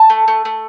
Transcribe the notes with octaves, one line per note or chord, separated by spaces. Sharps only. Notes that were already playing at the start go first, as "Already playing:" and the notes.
Already playing: A5
A3
A3
A3